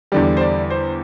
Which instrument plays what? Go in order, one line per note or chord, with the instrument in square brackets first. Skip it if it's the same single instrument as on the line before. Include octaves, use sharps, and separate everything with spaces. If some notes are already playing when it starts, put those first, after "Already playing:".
[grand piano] E2 D3 G3 D5
C5
D5
C5